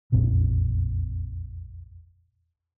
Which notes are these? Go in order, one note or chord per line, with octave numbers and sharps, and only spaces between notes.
E1 A#1 F2 C4